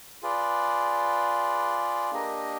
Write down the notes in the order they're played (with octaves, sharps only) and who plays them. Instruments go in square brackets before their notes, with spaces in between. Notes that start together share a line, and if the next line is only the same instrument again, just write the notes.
[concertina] F4 G#4 B4 D5
A#3 D4 G4 A#4 D#5